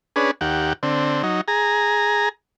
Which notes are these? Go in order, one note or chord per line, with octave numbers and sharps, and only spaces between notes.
C#4 D4 G#4 B4
D#2 G4 F#5
D3 C4
F#3 D#4
G#4 A#5